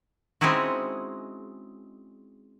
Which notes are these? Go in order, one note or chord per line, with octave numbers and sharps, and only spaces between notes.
G#3 C4 C#4 D#4 E4 F#4